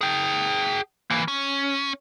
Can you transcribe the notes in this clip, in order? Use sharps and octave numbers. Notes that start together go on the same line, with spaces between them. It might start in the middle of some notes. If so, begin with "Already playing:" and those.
G#4 G5
E3 A#3
C#4